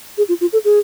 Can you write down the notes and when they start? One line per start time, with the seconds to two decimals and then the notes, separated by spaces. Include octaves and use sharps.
0.18 G#4
0.29 F4
0.41 F4
0.53 A4
0.65 G#4